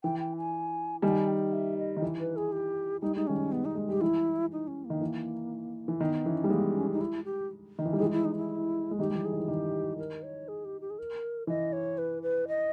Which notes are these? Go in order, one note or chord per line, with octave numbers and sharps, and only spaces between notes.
E3 G5
G5
G#5
D#3 G3 G#5
G5
E5
D#5
D#3
E3
B4
G#4
G4
G3 D#4
G#3 D#4
D#3 G3 C#4
B3
D#4
G#3
G3 G4
E3 E4
D#4
C#4
A#3
D#3
E3
E3
D#3 B3
E3 C#4
G3
E3 G#3 A#3
B3
C#4
D#4
E4
G4
D#3
E3
G3
E3 G#3 G#4
D#4
E4
D#4
E4
G#3
D#3 G3 G4
G3
E3
G#4
D#3
E3
D#3 G4
A#4
C#5
G#4
G4
G4
G#4
A#4
E3 D#5
C#5
B4
B4
D#5